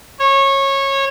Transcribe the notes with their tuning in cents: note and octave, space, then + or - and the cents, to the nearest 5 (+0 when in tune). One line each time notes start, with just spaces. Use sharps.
C#5 -20